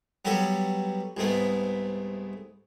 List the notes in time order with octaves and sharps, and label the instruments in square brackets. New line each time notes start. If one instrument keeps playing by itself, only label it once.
[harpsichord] F#3 G3 B3 G4 A4 C#5
C2 G#2 A3 B3